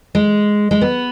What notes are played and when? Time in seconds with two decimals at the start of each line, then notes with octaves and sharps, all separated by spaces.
0.15 G#3
0.71 G#3
0.81 B3